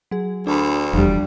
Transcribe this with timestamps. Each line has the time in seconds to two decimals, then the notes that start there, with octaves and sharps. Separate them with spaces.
0.11 F#3 G#4
0.47 D2 D4 A5 B5
0.93 F1 E2 F3 G3 D4